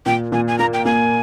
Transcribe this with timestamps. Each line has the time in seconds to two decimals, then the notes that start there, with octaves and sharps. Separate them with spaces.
0.06 A#2 G5
0.32 A#2 G#5
0.48 G#5
0.59 A#3 A#5
0.73 G5
0.85 A#3 G#5